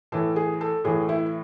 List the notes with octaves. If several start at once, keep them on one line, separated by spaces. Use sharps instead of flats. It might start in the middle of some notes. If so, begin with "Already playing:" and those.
A2 E3 A4
G#4
A4
A2 E3 G#4
E4